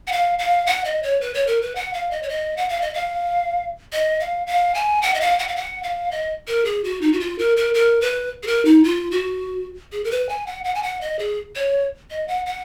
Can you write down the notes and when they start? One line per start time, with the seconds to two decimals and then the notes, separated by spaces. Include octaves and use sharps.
0.07 F#5
0.12 F5
0.39 F5
0.66 F#5
0.85 D#5
1.03 C#5
1.21 B4
1.34 C#5
1.47 A#4
1.62 B4
1.75 F#5
1.94 F5
2.11 D#5
2.23 C#5
2.29 D#5
2.57 F#5
2.69 F5
2.82 D#5
2.94 F5
3.93 D#5
4.20 F5
4.47 F5
4.74 G#5
5.02 F#5
5.14 D#5
5.21 F5
5.39 F#5
5.48 F5
5.56 F#5
5.83 F5
6.11 D#5
6.48 A#4
6.65 G#4
6.84 F#4
7.01 D#4
7.13 F#4
7.20 F4
7.39 A#4
7.57 A#4
7.74 A#4
8.01 B4
8.43 G#4
8.47 A#4
8.65 D#4
8.84 F4
9.11 F#4
9.92 G#4
10.04 A#4
10.11 B4
10.29 G#5
10.47 F#5
10.64 F#5
10.75 G#5
10.83 F#5
11.01 D#5
11.19 G#4
11.56 C#5
12.11 D#5
12.28 F#5
12.46 F#5